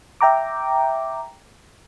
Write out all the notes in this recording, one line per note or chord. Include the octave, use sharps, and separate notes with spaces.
E5 G5 A#5 D6